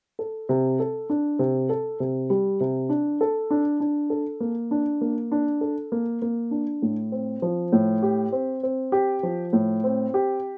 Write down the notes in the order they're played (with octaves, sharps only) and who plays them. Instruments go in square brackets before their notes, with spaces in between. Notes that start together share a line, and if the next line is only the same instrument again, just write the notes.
[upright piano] A4
C3
A4
D4
C3
A4
C3
G3
C3
D4
A4
D4
D4
A4
A#3
D4
A#3
D4
A4
A#3
A#3
D4
A2
C4
F3
A2
G4
C4
C4
G4
F3
A2
C4
G4